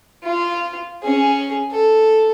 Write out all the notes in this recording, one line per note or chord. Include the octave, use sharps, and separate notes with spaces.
F4
C#4 G#4
A4